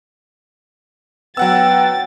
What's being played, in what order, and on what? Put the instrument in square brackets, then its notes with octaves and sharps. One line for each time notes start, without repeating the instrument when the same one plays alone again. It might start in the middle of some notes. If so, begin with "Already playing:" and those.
[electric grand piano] F#3 F#5 E6 [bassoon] B3 [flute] G5 [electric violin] A6